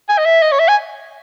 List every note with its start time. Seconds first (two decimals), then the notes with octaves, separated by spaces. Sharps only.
0.09 G#5
0.18 D#5
0.25 E5
0.42 D#5
0.52 C#5
0.59 E5
0.68 G#5